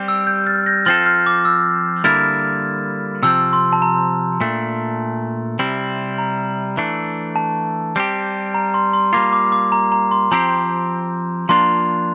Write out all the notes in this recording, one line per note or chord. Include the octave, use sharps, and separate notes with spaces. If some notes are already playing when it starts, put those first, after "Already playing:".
Already playing: G3 C4 G4
E6
G6
F6 A6
G6 A#6
F3 C4 F4 A4 F6 A6
F6
D6
E6
D3 G3 A#3 E4 A#4 F6 A6
C3 F3 C4 E6
C6
A5
A#5
A#2 A3 D4
C3 G3 C4 E4
A#5
E3 A3 D4
A5
G3 C4 G4
A#5
C6
C6
G3 A#3 F4 D6
D6
D6
A#5
A#5
C6
F3 C4 G4 C5 A#5
F3 A#3 D4 F4 C6